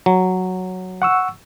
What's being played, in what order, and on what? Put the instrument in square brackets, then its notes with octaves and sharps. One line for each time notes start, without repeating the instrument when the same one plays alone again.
[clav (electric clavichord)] F#3
[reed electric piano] F#5 C#6 E6